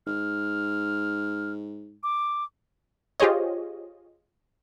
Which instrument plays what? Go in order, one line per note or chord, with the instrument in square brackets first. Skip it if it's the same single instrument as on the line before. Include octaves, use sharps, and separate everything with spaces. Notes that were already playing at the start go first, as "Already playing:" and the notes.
[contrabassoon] G#2 [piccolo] F6
[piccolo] D6
[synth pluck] F4 G4 G#4 C5 C#5 D#5